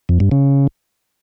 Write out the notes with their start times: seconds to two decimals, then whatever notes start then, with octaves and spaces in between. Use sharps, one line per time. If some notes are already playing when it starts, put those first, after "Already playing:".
0.09 F2
0.20 G2
0.32 C#3